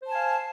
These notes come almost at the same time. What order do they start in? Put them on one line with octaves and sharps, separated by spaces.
C5 A5 G#5 F5